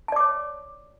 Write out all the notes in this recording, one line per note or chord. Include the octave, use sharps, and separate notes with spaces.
C#5 D5 A5 D6